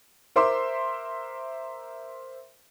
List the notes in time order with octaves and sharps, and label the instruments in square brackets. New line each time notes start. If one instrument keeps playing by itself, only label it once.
[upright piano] A#4 C5 E5 C6 D6